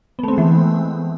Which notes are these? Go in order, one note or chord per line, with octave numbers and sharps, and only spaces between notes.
E3 G#3 A3 B3 C4